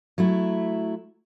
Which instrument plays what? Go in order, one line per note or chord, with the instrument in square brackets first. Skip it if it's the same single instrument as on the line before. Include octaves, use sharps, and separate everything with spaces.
[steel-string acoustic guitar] F#3 A3 E4